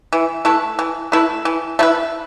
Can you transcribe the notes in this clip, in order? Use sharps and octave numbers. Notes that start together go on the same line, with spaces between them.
E3
A3 E4 B4
E3
A3 E4 B4
E3
A3 E4 B4